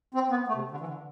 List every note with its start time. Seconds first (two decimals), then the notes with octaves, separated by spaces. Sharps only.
0.14 C4
0.30 B3
0.48 A3
0.55 C3
0.71 D3
0.80 E3
0.88 D3